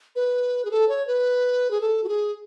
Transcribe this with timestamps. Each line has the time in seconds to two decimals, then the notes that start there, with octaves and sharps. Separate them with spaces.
0.16 B4
0.65 G#4
0.71 A4
0.89 C#5
1.07 B4
1.71 G#4
1.81 A4
2.04 F#4
2.08 G#4